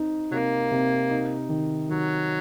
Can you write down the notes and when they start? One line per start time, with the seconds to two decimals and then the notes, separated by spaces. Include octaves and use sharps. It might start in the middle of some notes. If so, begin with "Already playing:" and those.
Already playing: C4 D#4
0.31 C3 F#3 A#3
0.71 C3
1.10 D#4
1.49 D#3
1.88 D#3 F#3